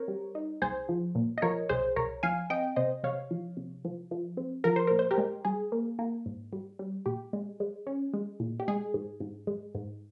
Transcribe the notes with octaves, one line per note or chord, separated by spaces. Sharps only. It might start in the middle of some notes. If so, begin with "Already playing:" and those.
Already playing: C4 A#4 C5 C#5
G3
D#4
C2 G#4 C5
F3
A#2
D#5
F3 A#4 C#5
C2 G#4 C5
C2 A#4 C#5
F3 F5 G#5
C4 D#5 G5
C3 C5 D#5
C3 C#5 F5
F3
C3
F3
F3
C4
F3 A#4
C5
A#2 A#4
C5
G4 A#4
G#3
G3 G#4
A#3
A#3
G#2
G3
G3
A#2 G4
G#3
G#3
C#4
G#3
A#2
G4
G#3 G#4
G#2
G#2
G#3
G#2